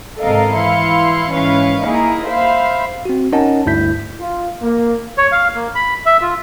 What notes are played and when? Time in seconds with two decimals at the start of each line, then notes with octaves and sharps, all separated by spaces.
0.20 G#1 C3 A4 A#4 D#5 F5
0.54 E3 E4 F5 C6 C#7
1.33 G#2 E3 C#4 B4 F5 C#6
1.83 A#3 D#4 E4 G#4 A#4
2.26 C5 E5 F5 B5
3.05 C4 F#4
3.33 C#4 D#4 A#4 D#5 F#5 A5
3.66 D2 G2 E4 G6 B6
4.20 F4
4.62 A#3
5.18 C#5
5.32 F5
5.55 A#3
5.75 B5
6.06 E5
6.21 F4